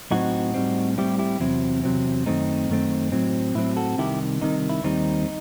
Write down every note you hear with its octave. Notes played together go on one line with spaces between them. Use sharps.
A2 F#3 C4 D#4 F#4
A2 G3 C4
A2 G3 C4 E4 G4
E4 G4
E2 C3 F#3 C4 E4
E2 C3 F#3 C4
F#2 D#3 A3 C4 D#4
F#2 D#3 A3 C4
A2 F#3 C4
A2 F#3 C4 E4
F#4 A4
C2 C3 D#3 E4 G4
C2 C3 D#3 D#4
E4
D#2 D#3 G3 C4 D#4